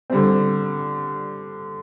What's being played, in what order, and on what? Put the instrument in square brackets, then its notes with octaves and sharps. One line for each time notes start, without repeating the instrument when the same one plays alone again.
[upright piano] D3 G3 C4